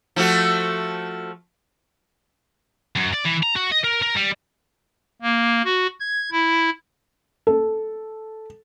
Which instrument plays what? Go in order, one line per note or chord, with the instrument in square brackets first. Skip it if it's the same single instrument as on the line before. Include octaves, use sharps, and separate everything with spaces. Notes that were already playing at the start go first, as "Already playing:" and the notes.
[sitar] F3 A3 F#4
[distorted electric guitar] F#2
D5
E3
A#5
F#4
D#5
A#4
A#4
G3
[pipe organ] A#3
F#4
G#6
E4
[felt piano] A4